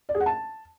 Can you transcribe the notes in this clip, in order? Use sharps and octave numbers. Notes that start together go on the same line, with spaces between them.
D5
G#4
F#5
A5